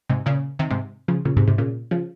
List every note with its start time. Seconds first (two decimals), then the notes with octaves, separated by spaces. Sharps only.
0.09 G#2 C3
0.26 A#2 C#3
0.59 C3 D#3
0.71 G#2 C3
1.08 C#3 F3
1.25 A#2 C#3
1.37 G#2 C3
1.48 G#2 C3
1.58 A#2 C#3
1.91 C#3 F3